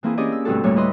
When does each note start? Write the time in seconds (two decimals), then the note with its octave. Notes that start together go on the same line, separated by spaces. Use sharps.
0.03 E3 A#3 C4 E4 G#4
0.17 C4 C#4 G4 G#4 D5 D#5
0.32 E6
0.45 D2 G2 B2 C4 F#4 A4
0.64 D2 A2 G3 A#3 C#5
0.76 E4 B4 D#5 C6